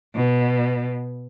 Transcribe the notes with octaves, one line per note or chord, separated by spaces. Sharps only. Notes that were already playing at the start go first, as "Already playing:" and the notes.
B2